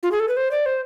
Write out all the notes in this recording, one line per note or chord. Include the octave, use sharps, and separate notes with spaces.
F4
G#4
A4
B4
C5
D5
C5